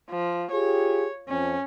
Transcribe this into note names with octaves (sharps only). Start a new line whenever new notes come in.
F3
F4 G4 G#4 C#5
F2 C#4